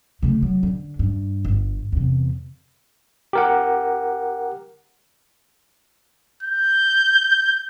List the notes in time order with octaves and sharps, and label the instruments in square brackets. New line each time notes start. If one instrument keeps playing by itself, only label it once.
[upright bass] C#3 A3
F#3
D3
G2
G1
E2 C3
[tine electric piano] G4 A#4 F#5
[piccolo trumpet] G6